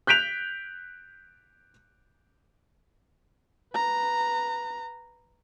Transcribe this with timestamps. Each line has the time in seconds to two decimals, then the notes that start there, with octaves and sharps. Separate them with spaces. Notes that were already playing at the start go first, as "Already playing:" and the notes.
0.07 F#6 G6 B6 D7 F7
3.74 B4 A#5